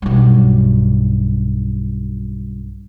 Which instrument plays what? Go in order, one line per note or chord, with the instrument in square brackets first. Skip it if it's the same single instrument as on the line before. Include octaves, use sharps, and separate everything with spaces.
[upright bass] B1 G2